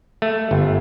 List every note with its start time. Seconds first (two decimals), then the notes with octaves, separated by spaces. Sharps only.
0.22 A3
0.51 G1